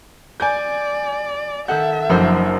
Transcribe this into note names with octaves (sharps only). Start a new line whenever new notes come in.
D5 G#5 G6
D#3 A4 E5 F#5 G6
F#1 F#2 F3 D4 C5 A#5